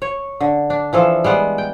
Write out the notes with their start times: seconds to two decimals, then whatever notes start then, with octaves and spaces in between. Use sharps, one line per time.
0.02 C#5
0.40 D3
0.70 D4
0.93 E3 F3 A4
1.24 G3 G#3 B3
1.58 G5